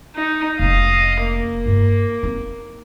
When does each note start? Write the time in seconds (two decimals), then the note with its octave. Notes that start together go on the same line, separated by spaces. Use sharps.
0.16 D#4
0.59 F1 C#4 D#5 F5
1.24 A#3
1.66 G2 E4
2.23 C4 D#4